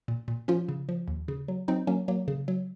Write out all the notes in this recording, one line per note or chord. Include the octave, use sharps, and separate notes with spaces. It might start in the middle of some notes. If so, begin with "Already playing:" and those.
A#2
A#2
F3 C#4 F4
C#3
F3
D#2
C#3
F#3
F#3 C4 D#4
F#3 A#3 C#4
F#3 A#3
C#3
F#3